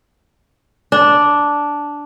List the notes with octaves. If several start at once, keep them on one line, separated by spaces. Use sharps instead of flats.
D4